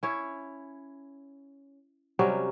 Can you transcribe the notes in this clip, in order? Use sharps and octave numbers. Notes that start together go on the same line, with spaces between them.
C#4 E4 C#5
C3 F#3 G3 C#4